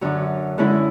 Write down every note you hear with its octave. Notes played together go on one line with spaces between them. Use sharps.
F#2 D3 F#3
D3 G#3 C#4 E4